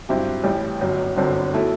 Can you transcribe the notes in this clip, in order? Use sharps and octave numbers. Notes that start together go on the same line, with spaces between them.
G2 F#3 C4 E4 G4
A1 A2 G3
G1 F#2 F#3
G1 F#2 D3 F#3 C4
B2 A3 E4